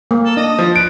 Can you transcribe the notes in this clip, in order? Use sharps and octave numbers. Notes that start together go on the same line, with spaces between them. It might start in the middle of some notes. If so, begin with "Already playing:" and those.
A#3
A4
D4 D#5
F3
B4 D7